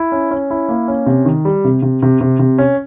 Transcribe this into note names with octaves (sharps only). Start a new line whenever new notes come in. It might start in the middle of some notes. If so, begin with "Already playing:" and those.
Already playing: E4
C#4
C#4
E4
A#3
C#4
C3
D#3
G3
C3
C3
C3
C3
C3
C#4